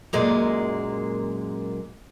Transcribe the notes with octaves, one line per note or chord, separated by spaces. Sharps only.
F#2 A#2 G#3